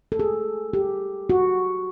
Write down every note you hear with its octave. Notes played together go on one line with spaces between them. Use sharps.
A4
G#4
G4
F#4